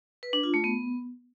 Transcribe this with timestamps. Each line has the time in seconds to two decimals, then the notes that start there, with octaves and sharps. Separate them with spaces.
0.23 B4
0.33 D4
0.43 F4
0.54 A3
0.64 B3